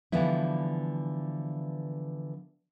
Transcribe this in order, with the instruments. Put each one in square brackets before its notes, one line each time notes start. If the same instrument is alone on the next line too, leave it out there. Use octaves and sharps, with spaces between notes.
[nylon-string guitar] D3 E3 F3 G3 B3 E4